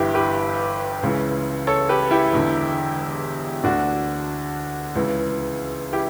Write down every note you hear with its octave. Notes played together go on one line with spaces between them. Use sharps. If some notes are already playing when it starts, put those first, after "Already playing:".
Already playing: G1 G2 E3 E4 G4
G4 B4
C#2 C#3 E3
A4 C#5
G4 B4
E4 G4
E1 E2 D3
D2 D3 D4 F#4
C#2 C#3 E3
E4 G4